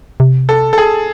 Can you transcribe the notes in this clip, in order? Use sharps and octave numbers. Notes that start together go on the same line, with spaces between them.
C3
A4
A4
G#4